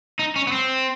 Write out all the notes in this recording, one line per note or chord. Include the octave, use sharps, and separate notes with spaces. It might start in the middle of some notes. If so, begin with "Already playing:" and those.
D#4
C#4
B3
C4